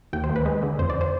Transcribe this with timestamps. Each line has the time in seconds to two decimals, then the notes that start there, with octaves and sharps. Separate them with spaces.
0.13 D#2 G5
0.24 C5
0.29 D#2
0.36 B4
0.45 G#3
0.63 D3
0.79 F2 C5
0.90 D5
1.01 C5